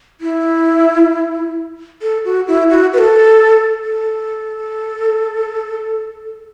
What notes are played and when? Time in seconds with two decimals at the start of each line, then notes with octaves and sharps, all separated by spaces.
0.21 E4
2.02 A4
2.25 F#4
2.48 E4
2.70 F#4
2.93 B4
2.98 A4
3.84 A4